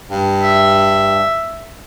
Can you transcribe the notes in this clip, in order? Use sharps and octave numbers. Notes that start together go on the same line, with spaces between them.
G2
E5